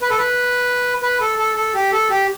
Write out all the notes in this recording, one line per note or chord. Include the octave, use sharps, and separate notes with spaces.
B4
A4
B4
B4
A4
A4
A4
G4
A4
G4